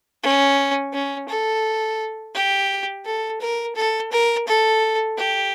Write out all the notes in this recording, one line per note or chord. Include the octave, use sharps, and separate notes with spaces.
C#4
C#4
A4
G4
A4
A#4
A4
A#4
A4
G4